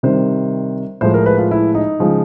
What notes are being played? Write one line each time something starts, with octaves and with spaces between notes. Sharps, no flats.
C3 D#3 G3 C5
A2 F3 G#3 C5
A#4
B4
F4
E4
D#4
C#3 F3 G#3